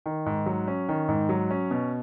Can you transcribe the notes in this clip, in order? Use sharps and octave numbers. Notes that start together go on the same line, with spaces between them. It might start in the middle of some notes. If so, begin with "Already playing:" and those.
D#3
G#2
F#3
C#4
D#3
G#2
F#3
C#4
B2